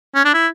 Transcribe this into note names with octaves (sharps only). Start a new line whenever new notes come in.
C#4
D4
E4